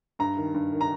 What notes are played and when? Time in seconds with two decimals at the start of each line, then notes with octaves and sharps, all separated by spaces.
0.19 G2 A#5
0.37 D#3
0.54 G2
0.72 D#3
0.81 A#5